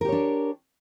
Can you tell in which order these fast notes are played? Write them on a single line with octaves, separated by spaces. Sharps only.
A#4 G4 C#5 D4